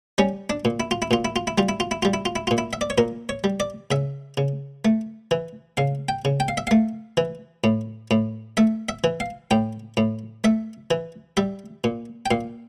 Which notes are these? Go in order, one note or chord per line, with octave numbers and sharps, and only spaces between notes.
G3 C#4
D4
A#2
E4
F4
E4
A#2 F4
E4
F4
E4
G3 F4
E4
F4
E4
G3 F4
E4
F4
E4
A#2 F4
E4
E5
D5
C#5
A#2 A#4
C#5
G3
D5
C#3 E5
C#3
A3
E3
C#3 F5
G5
C#3
G5
F5
E5
A3 F5
E3
A2
A2
A3 E5
E5
E3
F5
A2 G5
A2
A3 E5
E3
G3 E5
A#2
G5
A#2 F5